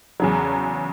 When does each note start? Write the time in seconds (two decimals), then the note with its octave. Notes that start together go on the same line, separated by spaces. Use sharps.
0.20 E2 C#3 F#3